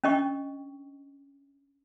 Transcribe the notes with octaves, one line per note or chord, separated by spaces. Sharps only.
C#4 D4 D#5 G5 C#6